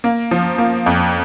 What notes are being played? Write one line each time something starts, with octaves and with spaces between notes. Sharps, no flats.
A#3
F3
A#3
F2